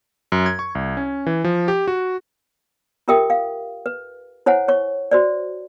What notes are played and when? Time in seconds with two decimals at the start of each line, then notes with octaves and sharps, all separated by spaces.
0.32 F#2
0.46 G#6
0.59 C#6
0.75 C2
0.97 C#4
1.26 E3
1.44 F3
1.68 G4
1.88 F#4
3.08 F4 G4 A#4 E5 G5 D#6
3.30 F5
3.86 B4
4.46 E4 C5 C#5 F#5 G#5
4.68 C#5 C#6
5.11 F#4 C5 D5